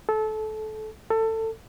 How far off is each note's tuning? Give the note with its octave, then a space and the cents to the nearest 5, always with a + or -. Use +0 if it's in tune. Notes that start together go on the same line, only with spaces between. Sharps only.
A4 -25
A4 +20